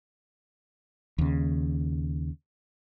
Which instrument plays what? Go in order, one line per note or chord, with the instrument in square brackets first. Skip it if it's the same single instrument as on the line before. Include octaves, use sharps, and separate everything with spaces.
[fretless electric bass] D#2 C#3